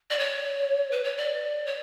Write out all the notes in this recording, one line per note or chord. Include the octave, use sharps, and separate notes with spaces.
D5
C#5
B4
C#5
D5
C#5